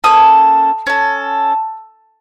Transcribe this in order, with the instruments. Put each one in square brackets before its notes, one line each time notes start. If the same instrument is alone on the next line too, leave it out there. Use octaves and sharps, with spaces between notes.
[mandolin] A#3 C#4 A4 D#6
C#4 A4